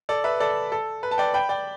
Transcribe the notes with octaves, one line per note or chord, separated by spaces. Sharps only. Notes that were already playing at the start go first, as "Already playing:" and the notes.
A4 D5
B4 E5
A4 D5
A4
B4
A5
D5 G5
G5 B5
D5 G5